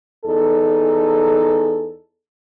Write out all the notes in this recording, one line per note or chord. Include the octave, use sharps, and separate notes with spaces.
E2 D#4 G#4 A4